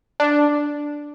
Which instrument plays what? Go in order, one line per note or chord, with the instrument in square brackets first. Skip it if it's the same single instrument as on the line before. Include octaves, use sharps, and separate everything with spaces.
[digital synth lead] D4